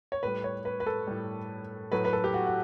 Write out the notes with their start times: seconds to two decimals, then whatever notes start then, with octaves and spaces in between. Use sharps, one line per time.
0.12 C#5
0.23 A2 G3 B4
0.44 C#5
0.65 B4
0.80 B4
0.86 A4
1.07 A2 G3
1.92 A2 F#3 A3 B4
2.05 B4
2.13 A4
2.24 G4
2.34 F#4
2.47 F#4